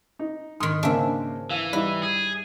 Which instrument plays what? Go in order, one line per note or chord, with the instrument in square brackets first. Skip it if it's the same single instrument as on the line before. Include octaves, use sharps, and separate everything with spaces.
[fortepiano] D#4
[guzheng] G#2 D#3 [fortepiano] C6 D#6
[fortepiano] C#3 A#3 C5 [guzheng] D4 E5
[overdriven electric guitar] E3 [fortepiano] F5
[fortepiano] G3 D#4 E4 [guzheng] B4
[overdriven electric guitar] G#4